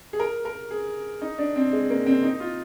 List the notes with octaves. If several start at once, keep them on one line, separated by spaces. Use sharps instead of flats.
G#4
A#4
A#4
G#4
D#4
D4
C4
G#3
A#3
C4
D#4
F4